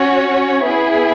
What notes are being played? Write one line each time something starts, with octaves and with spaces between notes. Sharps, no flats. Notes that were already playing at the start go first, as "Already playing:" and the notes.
Already playing: C#4 F#4 C#5
B3 E4 G#4